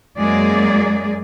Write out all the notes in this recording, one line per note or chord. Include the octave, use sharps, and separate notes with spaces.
F#2 F#3 G#3 A#3 G#4 D5